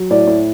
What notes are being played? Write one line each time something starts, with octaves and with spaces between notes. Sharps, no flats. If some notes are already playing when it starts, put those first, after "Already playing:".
Already playing: F#3
A2 D5
A2